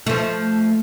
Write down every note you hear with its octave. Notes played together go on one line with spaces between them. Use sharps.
F3 A3